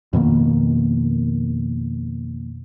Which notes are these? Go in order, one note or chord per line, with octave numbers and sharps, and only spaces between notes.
F2 B2 D#3 A#3